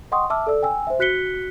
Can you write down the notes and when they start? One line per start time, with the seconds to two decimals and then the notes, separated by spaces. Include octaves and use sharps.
0.12 D#5 F#5 G5 C6 C#6 D#6
0.30 E5 A5 D6 E6 F6
0.47 A4 D5 E6
0.63 G5 G#5 E6
0.87 C5 E5
0.99 F#4 F#6 B6 C#7 G7